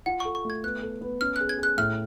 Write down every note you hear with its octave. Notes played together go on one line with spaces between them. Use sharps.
F4 F#5
A4 C#6
C#6
A3 G#6
B3 F#6
A4
B3
C#4 F6
G#4 F#6
G#6
G#4 F#6
A2 F6